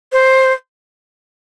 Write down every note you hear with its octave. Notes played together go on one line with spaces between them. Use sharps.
C5